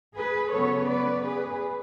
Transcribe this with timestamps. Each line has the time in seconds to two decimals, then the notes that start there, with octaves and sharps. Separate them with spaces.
0.15 G#4 B4
0.51 C#3 F#3 B3 A4 C#5
0.87 B4 D5
1.23 G#4 B4